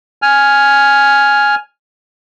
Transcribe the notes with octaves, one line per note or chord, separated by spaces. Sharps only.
G#5 F6